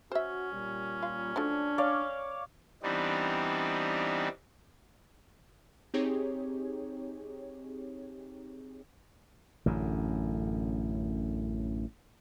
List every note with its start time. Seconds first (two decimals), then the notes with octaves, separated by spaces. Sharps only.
0.12 C#4 F#4 C5 E5
0.52 A#2 G3
1.03 F4
1.36 F3 F#3 A3 D4
1.78 C#5 D5 F5
2.83 E3 G3 B3 C4 D4 D#4
5.94 C4 D#4 G4 G#4 C#5
9.66 A1 F#2 D3